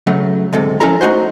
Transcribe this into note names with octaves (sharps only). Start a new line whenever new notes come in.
C#3 F#3 A3
D2 G#2 C3 A4
F3 C#4 E4 A4 A#4 A#5
A3 D#4 F#4 C5